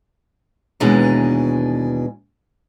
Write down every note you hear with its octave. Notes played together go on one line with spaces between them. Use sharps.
D#2 B2 E3 G#3 D4 A#5